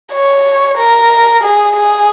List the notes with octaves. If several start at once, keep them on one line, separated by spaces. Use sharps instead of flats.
C#5
A#4
G#4
G#4